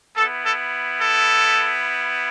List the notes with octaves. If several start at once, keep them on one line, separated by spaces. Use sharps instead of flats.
B3 E4 A4
A4
A4